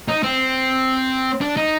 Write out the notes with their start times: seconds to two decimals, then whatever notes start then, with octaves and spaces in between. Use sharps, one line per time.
0.08 D#4
0.23 C4
1.41 D4
1.57 D#4